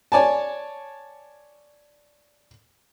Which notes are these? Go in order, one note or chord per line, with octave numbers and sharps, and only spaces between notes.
C#5 D5 G#5 A5